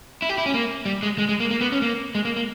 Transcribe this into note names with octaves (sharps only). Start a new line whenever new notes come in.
E4
G4
E4
C#4
A#3
G3
G#3
G#3
G#3
A#3
A#3
B3
C#4
A#3
G#3
A#3
A#3